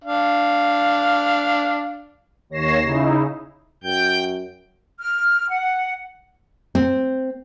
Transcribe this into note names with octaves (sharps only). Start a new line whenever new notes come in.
D4 F5
D#2 C#5 A#6 C7 E7
C#3 D#4 E4
F#2 G5 G6
F6
F#5
C4